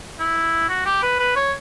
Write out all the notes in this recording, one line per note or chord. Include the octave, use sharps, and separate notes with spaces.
E4
F#4
G4
B4
B4
C#5